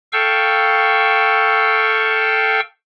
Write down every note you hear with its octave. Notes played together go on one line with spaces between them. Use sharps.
A4 F5 G5 C#6 E6